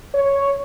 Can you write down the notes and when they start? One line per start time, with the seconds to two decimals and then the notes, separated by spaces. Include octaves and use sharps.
0.14 C#5